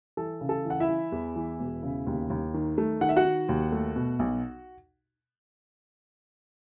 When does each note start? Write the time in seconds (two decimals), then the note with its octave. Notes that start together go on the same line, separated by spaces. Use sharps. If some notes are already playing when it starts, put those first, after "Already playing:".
0.17 E3 A4
0.41 C#3
0.49 A4
0.65 E3
0.70 F#5
0.80 E4 E5
0.88 E3
1.12 E2
1.36 E3
1.59 E1
1.83 C#3
2.07 D#2
2.30 D#2
2.54 D#3
2.78 A3
3.01 D#3 F#5
3.09 E5
3.16 F#4 F#5
3.25 D#3
3.49 D#2
3.72 A3
3.96 B2
4.19 B1